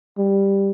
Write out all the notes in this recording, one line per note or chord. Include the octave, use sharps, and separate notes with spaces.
G3